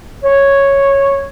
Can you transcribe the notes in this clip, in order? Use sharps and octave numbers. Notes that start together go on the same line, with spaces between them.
C#5